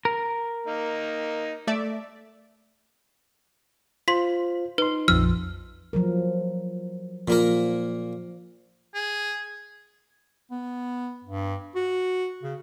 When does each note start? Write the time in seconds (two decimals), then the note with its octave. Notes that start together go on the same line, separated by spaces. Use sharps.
0.05 A#4
0.67 A#3 D#4
1.67 A3 D5 E5
4.08 F4 C5 C6 B6
4.78 D#4 B4 C6
5.08 A#1 F2 F3 E6 F6
5.93 F3 F#3 A#4
7.28 A#2 F3 A#3 A#4
8.95 G#4
10.51 B3
11.24 G2
11.75 F#4
12.43 C#3